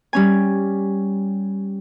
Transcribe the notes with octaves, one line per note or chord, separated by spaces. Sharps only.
G3 C#4 G#5